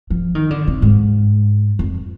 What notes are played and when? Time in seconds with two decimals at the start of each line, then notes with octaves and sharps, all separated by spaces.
0.10 F3
0.35 D#3
0.51 D3
0.67 C3
0.82 G#2
1.79 F2